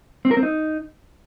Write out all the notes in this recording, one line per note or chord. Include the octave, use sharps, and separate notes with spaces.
C4
A#4
C4
D#4